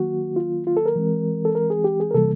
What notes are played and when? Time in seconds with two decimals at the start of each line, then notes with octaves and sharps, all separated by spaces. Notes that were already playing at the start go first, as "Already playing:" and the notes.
Already playing: D#3 F#3 A#3 F#4
0.36 F4
0.67 F4
0.77 A4
0.86 A#4
0.96 E3 G#3 C4
1.45 A4
1.55 A#4
1.70 G#4
1.84 G4
2.00 G#4
2.11 A#4
2.14 C3 E3 G3 A#3 A4